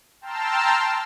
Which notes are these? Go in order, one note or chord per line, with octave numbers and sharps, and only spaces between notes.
G5 A5 A#5 C6 E6 F6